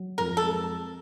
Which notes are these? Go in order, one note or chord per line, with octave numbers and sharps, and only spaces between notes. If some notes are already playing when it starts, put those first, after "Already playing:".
Already playing: F#3
F2 A#4
A4
G#3